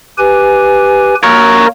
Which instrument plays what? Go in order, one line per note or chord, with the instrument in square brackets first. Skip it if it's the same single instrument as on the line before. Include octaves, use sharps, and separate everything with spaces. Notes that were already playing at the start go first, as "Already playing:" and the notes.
[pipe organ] G4 B4 G#5
[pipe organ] A#3 [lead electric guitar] A#4 C#5